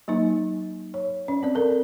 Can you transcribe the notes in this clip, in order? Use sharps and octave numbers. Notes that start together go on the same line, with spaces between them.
F#3 A#3 D#4
C#5
C#4
C4 D5
A4 A#4